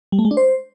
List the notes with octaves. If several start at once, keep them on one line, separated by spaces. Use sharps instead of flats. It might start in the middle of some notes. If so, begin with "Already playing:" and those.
G3
A3
G#3
D4
C5